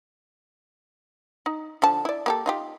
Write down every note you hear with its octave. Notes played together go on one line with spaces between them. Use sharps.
D#4
D3 F3 A5
E4 D5
A#3 G4 A4
D#4 F4 G4